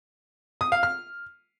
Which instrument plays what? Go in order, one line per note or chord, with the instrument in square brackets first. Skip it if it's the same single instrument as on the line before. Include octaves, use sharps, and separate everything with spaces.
[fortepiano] D#6
F5
F6